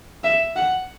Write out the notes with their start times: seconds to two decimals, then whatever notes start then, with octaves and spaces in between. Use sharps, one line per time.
0.24 E5
0.56 F#5